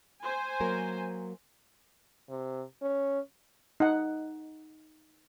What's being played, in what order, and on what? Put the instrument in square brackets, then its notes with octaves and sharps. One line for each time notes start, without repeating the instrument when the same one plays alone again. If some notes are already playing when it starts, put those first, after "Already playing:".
[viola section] C5 G#5
[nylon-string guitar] F#3 A#3 A#4
[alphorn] C3
C#4
[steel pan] D#4 F#5